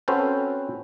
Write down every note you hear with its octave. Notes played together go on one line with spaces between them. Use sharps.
C4 C#4 F#4 A4 B4 C5